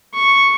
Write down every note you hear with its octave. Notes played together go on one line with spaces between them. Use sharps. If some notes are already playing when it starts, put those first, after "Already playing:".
C#6